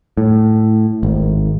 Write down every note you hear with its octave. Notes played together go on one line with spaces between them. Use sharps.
A2
G#1